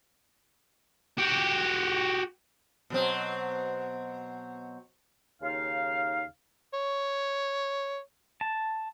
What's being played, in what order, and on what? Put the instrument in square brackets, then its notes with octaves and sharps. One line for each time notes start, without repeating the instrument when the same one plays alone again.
[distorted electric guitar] F#4 G4
[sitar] B2 F#3 C4
[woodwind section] D#2 C#3 D#4 F5
[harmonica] C#5
[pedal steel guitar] A5